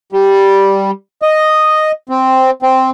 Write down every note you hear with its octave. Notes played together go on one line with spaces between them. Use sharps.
G3
D#5
C4
C4